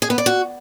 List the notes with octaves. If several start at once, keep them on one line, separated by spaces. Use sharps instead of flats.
G#4
B3
D5
F#4